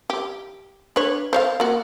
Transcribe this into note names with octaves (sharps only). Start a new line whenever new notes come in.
G4
D4 B4 C#5
C5 C#5 F5
A#3 F#4